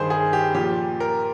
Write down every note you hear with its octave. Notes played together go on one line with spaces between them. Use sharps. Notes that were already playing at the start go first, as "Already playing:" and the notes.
Already playing: G2 D#3 G#4 C5
G#4
G4
A#2 F3 G4
A#4